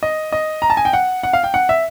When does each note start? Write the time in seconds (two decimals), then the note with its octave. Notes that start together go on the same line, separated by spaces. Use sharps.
0.03 D#5
0.32 D#5
0.62 A#5
0.70 A5
0.77 G#5
0.85 G5
0.93 F#5
1.23 F#5
1.33 F5
1.44 G5
1.54 F#5
1.69 E5